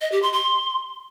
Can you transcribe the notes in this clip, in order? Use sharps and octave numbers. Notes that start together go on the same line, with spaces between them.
D#5
G4
C6
C6